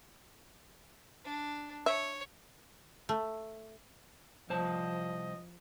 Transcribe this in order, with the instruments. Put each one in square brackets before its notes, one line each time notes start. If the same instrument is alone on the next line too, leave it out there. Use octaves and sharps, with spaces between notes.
[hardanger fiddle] D4
[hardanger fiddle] C#5 [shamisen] E5
[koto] A3
[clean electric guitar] C2 C5 A5 [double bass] F3 [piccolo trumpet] D#5